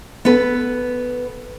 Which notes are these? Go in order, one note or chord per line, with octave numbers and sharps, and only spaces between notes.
B3 A4 B4